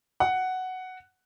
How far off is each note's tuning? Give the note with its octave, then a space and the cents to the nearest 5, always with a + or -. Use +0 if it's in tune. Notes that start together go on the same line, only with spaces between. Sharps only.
F#5 +5